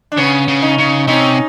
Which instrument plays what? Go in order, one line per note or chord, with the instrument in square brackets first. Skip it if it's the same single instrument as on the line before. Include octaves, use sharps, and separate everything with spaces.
[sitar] D4
[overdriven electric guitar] C#3 [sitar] B3 C#4
[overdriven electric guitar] C#3
[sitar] C#4 D#4
[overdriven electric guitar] C#3
[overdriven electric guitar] C3 [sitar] C#4 D#4